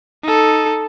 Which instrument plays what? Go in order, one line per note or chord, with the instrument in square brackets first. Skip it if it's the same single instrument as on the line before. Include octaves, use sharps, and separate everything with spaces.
[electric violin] D#4 A4